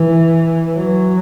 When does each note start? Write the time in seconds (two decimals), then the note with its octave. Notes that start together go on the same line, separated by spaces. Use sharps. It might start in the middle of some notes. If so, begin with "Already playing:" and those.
Already playing: E3
0.76 F#3